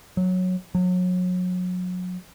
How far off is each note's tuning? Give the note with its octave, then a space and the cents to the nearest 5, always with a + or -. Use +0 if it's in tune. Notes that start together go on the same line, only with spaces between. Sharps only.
F#3 -10
F#3 -30